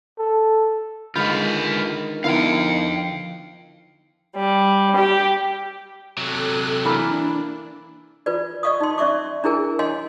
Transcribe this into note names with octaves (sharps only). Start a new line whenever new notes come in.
A4
D3 D#3 G#3 F4 B4 B5 G6
D3 F3 B3 D#4 E4 A#4 F5 G5
G3
G4
C3 F#3 A4 F#6
E3 A#3 D4 E4
F4 B4 D5
D5 D#5 F5 C#6 D#6
D#4 C6
C#4 D5 E5 C#6 D6
D4 E4 G#4 A#4 G#5
C#5 D#5 F5 G#5 C6